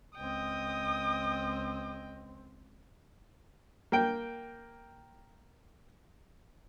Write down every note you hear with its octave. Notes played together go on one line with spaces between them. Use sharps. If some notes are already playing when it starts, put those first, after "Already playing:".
C#2 C4 D#5 G5 D#6
A#3 G5